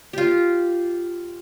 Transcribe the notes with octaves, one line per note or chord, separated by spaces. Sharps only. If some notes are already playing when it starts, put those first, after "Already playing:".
F4 G4